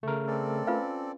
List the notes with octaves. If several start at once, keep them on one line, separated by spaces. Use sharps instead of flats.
C#3 A3 A#4
C4 A4 D5
C#4 F4 B4 F5